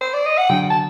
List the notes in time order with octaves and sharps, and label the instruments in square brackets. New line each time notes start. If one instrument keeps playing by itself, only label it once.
[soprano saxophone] C5
D5
D#5
F#5
[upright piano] D3 F#3 [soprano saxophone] G5
[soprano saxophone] A5